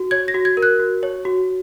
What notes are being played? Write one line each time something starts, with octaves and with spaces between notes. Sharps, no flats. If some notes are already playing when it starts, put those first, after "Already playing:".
Already playing: F#4
C#5 G#6
A#6
F#4
G#6
A#4
F#6
F#4
C#5
F#4